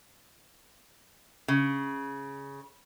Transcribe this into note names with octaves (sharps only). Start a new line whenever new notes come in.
C#3